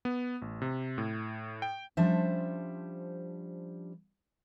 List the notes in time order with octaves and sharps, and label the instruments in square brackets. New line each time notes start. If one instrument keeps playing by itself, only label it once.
[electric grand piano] B3
A1
C3
A2
G5
[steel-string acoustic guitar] F3 G3 C#4 D4 C5 E5